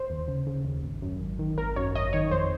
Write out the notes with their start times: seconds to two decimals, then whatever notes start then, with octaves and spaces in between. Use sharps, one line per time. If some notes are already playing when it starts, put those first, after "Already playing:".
Already playing: C5
0.10 D#2
0.28 C#3
0.47 C#3
0.65 D#2
0.83 G#1
1.02 F#2
1.21 G#1
1.39 D#3
1.58 G#1 A#4
1.76 F#2 C#5
1.95 G#1 D#5
2.13 D#3 C#5
2.31 F2 C5